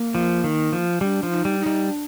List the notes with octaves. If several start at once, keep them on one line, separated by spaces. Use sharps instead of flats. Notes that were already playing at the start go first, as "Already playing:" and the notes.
Already playing: A#3
F3
D#3
F3
G3 D4
F3
D#4
G3
D#4
G3
D4